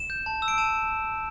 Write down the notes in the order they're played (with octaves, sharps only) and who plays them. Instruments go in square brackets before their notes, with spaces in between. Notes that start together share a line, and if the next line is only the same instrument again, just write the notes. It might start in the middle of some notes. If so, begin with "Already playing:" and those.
Already playing: [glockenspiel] E7
G6
A5
E6
D7
A5 E7